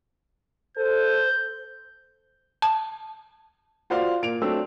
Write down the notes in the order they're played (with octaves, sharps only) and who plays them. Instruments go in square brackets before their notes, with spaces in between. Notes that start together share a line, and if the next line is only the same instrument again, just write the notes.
[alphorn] A4 [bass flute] C5 [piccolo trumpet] G6
[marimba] A5
[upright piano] F4 F#4 C5 D5 F5
A#2 D7 F7
F#3 A3 C4 D4 E6